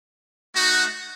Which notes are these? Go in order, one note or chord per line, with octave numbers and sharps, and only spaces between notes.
A3 D#4 F#4